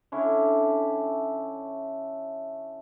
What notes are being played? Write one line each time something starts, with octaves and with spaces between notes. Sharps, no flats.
D3 C#4 E4